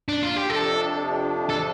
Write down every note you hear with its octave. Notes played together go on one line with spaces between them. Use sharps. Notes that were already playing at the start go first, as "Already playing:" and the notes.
D4
F4
G4
F2 C3 F3 D4 A4
A4